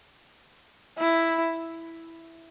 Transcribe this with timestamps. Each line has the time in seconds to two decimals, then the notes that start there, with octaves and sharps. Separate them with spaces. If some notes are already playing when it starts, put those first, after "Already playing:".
0.99 E4